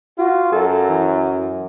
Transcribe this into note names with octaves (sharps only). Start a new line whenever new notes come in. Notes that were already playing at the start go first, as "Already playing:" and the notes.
F4 F#4
F#2 A4
E3